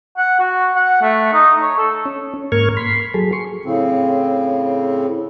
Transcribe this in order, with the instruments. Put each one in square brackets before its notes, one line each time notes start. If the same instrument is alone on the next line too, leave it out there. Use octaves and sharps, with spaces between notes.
[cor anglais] F#5
F#4
F#5
A3
D#4
C#5
A4
[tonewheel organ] C#4
G#2 A#3 A#4 C#6 F6 G#6
B5 C6
F#3 G#4 A4
C6 C#6
[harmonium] A2 C#3 C4